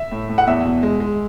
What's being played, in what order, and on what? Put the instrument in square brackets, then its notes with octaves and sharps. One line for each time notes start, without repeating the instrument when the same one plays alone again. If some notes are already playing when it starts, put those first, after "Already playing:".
Already playing: [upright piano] E5
[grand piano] A2
A2
[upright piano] F#5
[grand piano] E2 [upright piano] E5
[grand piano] B2
G#3
G#3